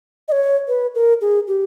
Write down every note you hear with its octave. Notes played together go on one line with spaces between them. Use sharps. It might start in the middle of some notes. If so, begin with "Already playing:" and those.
D#5
C#5
B4
A#4
G#4
G4